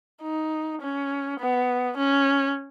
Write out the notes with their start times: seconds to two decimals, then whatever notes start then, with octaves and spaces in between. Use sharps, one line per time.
0.22 D#4
0.81 C#4
1.40 B3
1.97 C#4